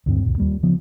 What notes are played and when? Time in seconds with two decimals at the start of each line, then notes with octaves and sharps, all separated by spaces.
0.06 D2 G2 C4
0.23 C#2 F#2 A#2
0.38 D#2 G3 A#3
0.63 C#3 F3 B3